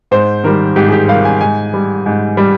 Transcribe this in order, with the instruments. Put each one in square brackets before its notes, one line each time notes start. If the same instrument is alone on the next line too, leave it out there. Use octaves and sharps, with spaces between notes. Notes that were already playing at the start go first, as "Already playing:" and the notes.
[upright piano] G#2 C5
D#3 G3 A#4
G#2 G4
G#4
G4
D#3 G3 F5
G#5
G#2 G#5
G3
G#2
G3